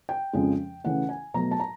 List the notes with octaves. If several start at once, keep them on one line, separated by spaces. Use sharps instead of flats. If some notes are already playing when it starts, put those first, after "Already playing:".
G5
F2 C#3 F3 G#3
C#3 E3 A3 F#5
G#5
B2 F#3 A3 A#5
A5
A#5